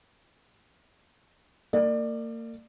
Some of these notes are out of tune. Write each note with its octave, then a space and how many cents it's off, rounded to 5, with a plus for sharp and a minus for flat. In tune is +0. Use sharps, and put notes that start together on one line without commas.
A#3 -35 D5 +25